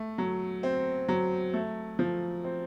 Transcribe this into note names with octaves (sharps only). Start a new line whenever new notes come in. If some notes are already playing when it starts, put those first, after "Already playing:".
Already playing: A3
F#3
C4
F#3
A3
F3
C4